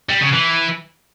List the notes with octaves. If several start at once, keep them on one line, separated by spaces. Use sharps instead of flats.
G3
C#3
E3